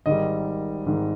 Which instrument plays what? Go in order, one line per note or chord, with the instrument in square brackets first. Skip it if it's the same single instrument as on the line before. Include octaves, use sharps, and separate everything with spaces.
[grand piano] G#1 G#2 D#3 G3 D#5
G#1 G#2 D#3 G3